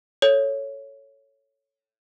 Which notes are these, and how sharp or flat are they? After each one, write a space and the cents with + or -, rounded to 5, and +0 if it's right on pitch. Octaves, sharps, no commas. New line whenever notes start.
A4 +5 C#5 +0